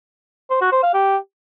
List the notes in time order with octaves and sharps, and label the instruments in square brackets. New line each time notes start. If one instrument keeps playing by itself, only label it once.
[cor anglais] C5
F#4
C5
F5
G4